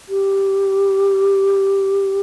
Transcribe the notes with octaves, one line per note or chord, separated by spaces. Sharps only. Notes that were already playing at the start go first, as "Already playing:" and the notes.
G4